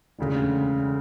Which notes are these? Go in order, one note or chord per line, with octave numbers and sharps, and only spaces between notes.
E1 D2 C#3